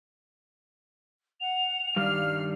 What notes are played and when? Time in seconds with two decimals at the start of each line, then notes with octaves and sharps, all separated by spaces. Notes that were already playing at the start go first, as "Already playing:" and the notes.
1.40 F#5 F7
1.96 G2 D#3 G3 F5 F6